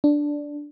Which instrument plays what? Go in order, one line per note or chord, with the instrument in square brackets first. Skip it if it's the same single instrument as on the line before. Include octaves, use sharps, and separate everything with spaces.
[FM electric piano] D4